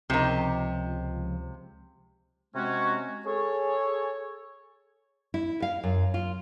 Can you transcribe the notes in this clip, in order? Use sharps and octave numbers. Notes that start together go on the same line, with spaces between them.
C#2 C3 D#3 F3 G4
C3 G#3 C#4 F#4
G#4 A4 C#5
E4
F5
F#2
F4